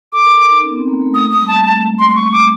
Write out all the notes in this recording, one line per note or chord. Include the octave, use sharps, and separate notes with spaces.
A4 D6
A#4
D#4
C#4
B3
C4
A#3
A3
A#3 D#6
D#6
G3
A#3 A5
A3 A5
G#3
A3 C6
C6
C#6
D6